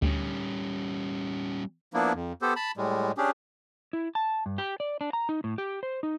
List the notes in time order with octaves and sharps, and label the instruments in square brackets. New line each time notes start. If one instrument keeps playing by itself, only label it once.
[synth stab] D2 [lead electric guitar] G3 C#4
[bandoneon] F3 A#3 B3 D4 E4
F2
B3 G4 A4 C5
A5 B5
A2 G3 G#3
C#4 D4 G4 G#4
[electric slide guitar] E4
A5
G2
G4
D5
D4
A#5
D#4
A2
G4
C5
D#4